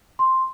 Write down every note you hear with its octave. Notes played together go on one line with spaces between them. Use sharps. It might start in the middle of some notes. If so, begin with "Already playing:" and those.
C6